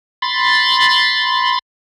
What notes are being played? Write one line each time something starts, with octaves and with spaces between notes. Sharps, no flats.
B5 C6 A6